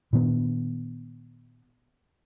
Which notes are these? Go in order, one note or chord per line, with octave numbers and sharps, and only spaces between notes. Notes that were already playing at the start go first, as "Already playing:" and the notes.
A#2 D#3 B3 D4